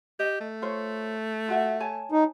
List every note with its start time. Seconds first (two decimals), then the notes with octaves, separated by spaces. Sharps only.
0.20 G4 D#5
0.41 A3
0.62 F4 C5 C#5
1.48 F4 F#4 E5
1.80 C#5 G#5 A5
2.12 D#4